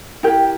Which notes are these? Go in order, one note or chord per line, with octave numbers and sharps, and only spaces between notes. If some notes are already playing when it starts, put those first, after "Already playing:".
E4 G4 A#4 G5